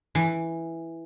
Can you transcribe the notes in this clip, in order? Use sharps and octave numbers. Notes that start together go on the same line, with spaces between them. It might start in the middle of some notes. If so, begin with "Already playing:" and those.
E3